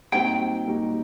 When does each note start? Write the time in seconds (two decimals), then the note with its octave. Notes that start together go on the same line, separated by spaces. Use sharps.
0.12 A#2 G3 C4 D#4 F#4 G5
0.67 A#2 G3 C4 D#4 F#4